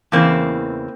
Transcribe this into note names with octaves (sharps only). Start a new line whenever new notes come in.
E2 C#3 E3 A#3 C4